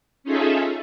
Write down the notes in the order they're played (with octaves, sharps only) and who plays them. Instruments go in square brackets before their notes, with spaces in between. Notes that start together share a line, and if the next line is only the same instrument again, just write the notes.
[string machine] C#4 D#4 F4 G#4 A4 E5